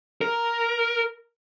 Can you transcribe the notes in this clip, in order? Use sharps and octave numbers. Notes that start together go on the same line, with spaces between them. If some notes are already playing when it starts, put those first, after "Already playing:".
A#4